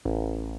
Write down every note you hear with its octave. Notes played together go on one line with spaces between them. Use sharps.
A1